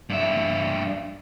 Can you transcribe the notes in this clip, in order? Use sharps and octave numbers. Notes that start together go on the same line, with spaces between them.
G2 E5